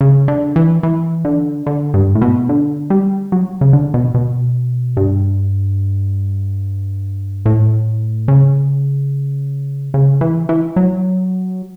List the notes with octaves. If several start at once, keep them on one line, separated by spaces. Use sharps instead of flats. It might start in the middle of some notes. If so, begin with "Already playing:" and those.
C#3
D3
E3
E3
D3
D3
G2
A2
B2
D3
G3
F#3
C#3
D3
B2
B2
G2
A2
C#3
C#3
E3
E3
F#3